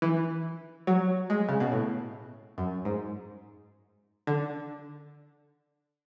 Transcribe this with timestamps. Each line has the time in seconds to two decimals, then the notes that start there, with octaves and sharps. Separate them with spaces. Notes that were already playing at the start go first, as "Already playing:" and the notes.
0.02 E3
0.87 F#3
1.30 G#3
1.49 C#3
1.60 B2
1.72 A2
2.58 F#2
2.85 G#2
4.27 D3